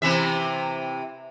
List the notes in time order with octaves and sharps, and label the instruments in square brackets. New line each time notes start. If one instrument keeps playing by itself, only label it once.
[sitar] C3 E3 E5